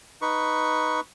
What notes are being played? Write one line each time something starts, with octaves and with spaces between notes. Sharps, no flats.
D#4 B4 C#6